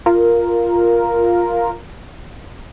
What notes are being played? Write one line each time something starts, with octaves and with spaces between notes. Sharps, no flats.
F4 A#4